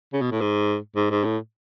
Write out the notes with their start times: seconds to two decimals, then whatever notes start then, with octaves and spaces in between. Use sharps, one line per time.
0.13 C#3
0.21 B2
0.31 A2
0.41 G#2
0.96 G#2
1.10 G#2
1.24 A2